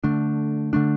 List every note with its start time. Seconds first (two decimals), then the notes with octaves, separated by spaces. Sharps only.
0.04 D3 A3 D4
0.73 D3 A3 D4